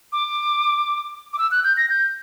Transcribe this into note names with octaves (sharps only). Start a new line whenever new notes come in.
D6
D6
E6
F#6
G6
A#6
G6